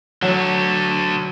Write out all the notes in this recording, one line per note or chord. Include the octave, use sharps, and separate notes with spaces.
D3 F#3 A3